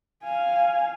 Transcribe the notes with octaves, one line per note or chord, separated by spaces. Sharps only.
F5 G#5